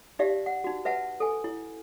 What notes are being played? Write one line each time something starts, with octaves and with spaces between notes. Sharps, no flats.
D#4 G4 D5 E5 F5
F#5
D#4 F#4
B4 E5 F#5 A5
A4 G#5
E4